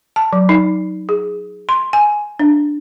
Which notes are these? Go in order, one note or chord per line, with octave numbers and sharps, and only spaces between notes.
A5
F#3
D#4
G#4
C6
G#5
D4